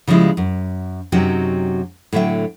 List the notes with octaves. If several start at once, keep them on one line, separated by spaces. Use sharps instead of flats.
C#3 F3 G3 G#3 E4
F#2
F#2 C3 F#3 C#4 D#4 G5
A2 D3 F#3 E5 G5